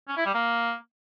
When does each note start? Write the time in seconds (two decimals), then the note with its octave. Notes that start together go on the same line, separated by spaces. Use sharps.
0.08 C#4
0.17 E4
0.26 G3
0.34 A#3